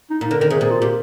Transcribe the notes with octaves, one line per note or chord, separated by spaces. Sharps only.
D#4
A#2 D#4
D3 A#4
D#3 A#4
C3 G#4
A#2 G#4
F4
A#2 G4